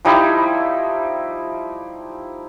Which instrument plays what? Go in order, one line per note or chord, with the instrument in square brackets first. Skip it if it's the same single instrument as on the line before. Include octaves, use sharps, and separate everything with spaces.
[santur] F3 G3 D#4 E4